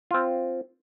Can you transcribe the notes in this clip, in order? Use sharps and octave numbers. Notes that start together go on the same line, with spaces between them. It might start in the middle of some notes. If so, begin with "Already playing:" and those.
C4 F4